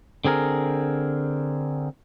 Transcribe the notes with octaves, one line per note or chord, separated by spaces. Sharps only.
D3 C4 G#4 A#4